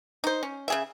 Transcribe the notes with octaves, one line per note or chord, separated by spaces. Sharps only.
D#4 C5
C#4
C#3 G#4 E5